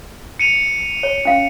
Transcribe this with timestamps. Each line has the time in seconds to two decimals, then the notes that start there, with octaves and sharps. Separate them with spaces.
0.39 C#7 D#7 F7
1.03 C#5
1.25 C#4 F5